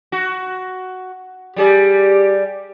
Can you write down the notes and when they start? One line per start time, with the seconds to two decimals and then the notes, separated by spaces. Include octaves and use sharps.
0.12 F#4
1.56 G3 G4 G#4 D5